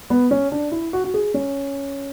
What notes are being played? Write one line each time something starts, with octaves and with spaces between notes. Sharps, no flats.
B3
C#4
D4
E4
F#4
F#4
G#4
C#4